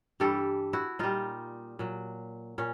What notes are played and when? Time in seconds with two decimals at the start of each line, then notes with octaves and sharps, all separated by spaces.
0.20 G2 E3 G3 G4 A4
0.73 E4 F#4
0.99 A#2 G3 D#4 F4
1.79 A#2 F#3
2.58 A#2 C#4